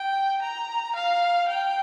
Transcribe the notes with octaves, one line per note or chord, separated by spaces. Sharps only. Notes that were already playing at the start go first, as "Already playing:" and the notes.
Already playing: G5
A#5
F5
G5